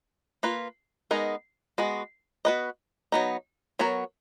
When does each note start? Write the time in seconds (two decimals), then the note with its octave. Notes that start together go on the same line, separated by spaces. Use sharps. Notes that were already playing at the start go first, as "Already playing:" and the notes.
0.43 A#3 F4 B4
1.11 G#3 B3 D#4 A#4
1.78 G#3 B3 F#4
2.45 B3 F#4 B4 D#5
3.12 F#3 B3 D#4
3.79 F#3 B3 F#4 A#4 C#5